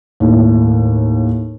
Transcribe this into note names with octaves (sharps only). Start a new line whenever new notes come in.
D#2 A2